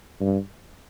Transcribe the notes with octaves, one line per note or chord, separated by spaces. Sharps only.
G2